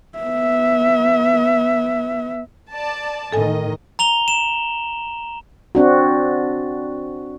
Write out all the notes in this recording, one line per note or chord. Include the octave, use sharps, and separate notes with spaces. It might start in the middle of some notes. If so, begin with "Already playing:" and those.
B3 E5
D5 A5
A2 D#3 A4 D#5 G#5
A#5 F7 G7
E7
C4 D4 F#4